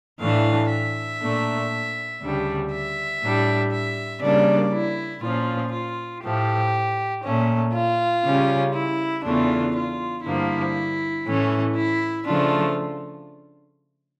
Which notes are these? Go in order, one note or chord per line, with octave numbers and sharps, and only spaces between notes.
A2 E3 A3 D4 F5
E5
A#2 A3 D4
D2 C#3 G3 D4
E5
A2 G3 D4
E5
C#3 G3 A#3 D4 D5
E4
A#2 F3 C#4 F4
F4
A2 F3 A3 G4
A#2 A3 C#4
F4
C#3 G3 C#4
E4
E2 C#3 E3 A3 D4 F4
F4
G2 D3 F3 A#3 E4
A2 E3 A3 C#4
E4
C#3 F3 A3 D4 F4